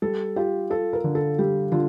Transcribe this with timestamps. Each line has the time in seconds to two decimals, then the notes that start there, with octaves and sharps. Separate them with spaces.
0.02 G3 A4
0.36 F4 G4
0.70 F4 A4
0.93 A#4
1.04 D3
1.15 A4
1.38 G3 G4
1.72 D3 F4